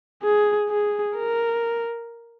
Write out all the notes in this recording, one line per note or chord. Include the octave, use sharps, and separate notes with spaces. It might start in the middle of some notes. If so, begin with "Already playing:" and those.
G#4
G#4
A#4